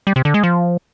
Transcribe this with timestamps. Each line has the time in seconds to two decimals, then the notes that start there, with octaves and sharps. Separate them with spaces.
0.07 G3
0.16 C3
0.25 D3
0.34 G#3
0.43 F3